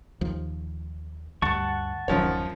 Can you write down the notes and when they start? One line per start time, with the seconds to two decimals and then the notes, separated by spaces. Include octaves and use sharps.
0.21 D#2 F3
1.42 D2 G2 F#5 A5 C#6
2.08 D1 F#2 D#3 F3 C#5